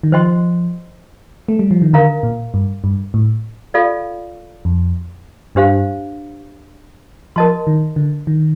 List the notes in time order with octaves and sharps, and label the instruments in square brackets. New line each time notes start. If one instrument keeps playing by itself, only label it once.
[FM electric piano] D#3
[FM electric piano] F3 [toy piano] C5 D#5 G5 C6
[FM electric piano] A3
G3
F3
D#3
[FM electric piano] D3 [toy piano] A#4 F5 A#5
[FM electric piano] A#2
G2
G2
A2
[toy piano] F4 A4 D5 F5
[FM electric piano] F2
[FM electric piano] G2 [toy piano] D4 G4 C5 F5
[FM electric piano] F3 [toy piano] A#4 D#5 A5 C6
[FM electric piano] D#3
D3
D#3